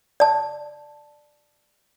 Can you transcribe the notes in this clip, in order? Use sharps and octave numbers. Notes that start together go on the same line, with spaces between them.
D5 A5